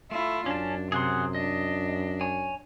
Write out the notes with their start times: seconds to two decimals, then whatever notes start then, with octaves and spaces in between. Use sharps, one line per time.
0.11 A3 E4 F4
0.46 F#2 C#4 D4 A5
0.92 C3 G#4 F#5 C6
1.35 D4 D#5
2.21 C#5 G#5